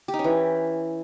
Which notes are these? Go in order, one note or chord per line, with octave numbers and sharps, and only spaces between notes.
G4
D#4
C#4
E3